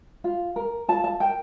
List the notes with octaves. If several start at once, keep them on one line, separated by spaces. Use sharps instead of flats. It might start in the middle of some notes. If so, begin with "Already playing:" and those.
F4
A#4
F4 A5
A5
A#4 G5